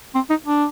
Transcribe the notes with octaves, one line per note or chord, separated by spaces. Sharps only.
C4
D#4
D4